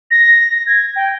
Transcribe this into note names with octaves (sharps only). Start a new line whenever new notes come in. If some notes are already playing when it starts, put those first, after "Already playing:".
A#6
G#6
G5